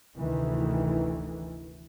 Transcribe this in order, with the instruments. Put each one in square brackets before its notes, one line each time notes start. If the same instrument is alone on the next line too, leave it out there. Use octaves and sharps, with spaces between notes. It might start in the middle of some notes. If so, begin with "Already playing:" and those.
[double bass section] F1 D2 D#3 E3